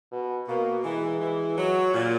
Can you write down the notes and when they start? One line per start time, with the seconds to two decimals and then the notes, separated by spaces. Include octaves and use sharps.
0.11 B2
0.48 B2 A#3
0.84 E3 G#3
1.21 E3
1.58 F#3
1.94 A#2